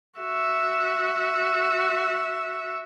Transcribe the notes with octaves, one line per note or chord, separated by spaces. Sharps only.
F#4 E5